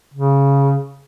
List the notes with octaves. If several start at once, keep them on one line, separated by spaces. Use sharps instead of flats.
C#3